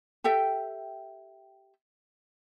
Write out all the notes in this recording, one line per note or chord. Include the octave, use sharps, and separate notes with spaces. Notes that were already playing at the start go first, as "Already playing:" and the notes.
G4 A4 E5 G5